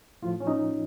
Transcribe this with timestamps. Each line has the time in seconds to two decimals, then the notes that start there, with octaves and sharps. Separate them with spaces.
0.22 A2 F3 F4
0.40 C#4
0.47 D#4